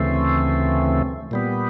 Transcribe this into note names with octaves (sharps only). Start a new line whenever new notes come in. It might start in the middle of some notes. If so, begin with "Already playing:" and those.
Already playing: D2 C#3 E3 A3 C4
A#2 G3 B3